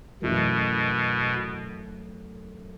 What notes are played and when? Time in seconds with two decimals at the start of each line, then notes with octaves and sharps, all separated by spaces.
0.22 F#2 B2 E3 A3 E4 A4